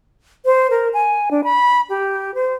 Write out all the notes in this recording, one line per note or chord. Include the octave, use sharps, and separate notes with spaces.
C5
A#4
G#5
D4
B5
G4
C5